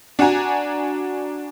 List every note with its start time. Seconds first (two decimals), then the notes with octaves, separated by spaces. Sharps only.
0.19 D4 F#4 F#5 G#5 A#5